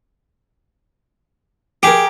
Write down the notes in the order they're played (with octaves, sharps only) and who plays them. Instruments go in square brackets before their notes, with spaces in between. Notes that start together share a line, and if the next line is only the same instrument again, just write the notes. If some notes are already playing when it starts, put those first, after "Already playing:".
[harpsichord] G4 [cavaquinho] G#4 A#4